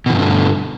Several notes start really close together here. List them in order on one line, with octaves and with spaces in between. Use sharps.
B2 E3 G2 F3 D3